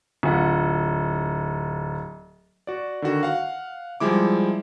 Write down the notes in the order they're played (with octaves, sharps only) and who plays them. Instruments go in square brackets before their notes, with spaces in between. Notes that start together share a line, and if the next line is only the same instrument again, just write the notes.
[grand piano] D1 F4 F#5
[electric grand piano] F#4 D5
D3 D#3 F#4
F5 F#5
F3 G3 G#3 E4 D6